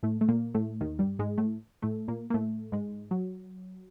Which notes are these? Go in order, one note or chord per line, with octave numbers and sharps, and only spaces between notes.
A2 A3
A3
A#2 A#3
A2 A3
D#2 D#3
G2 G3
G#2 G#3
A2 A3
A2 A3
A#2 A#3
A#3
A2 A3
G#2 G#3
F#3